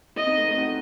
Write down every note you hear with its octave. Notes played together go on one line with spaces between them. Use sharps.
C4 E4 D#5
B3 D#4
A3 C4
A3 C4
D#4 F#4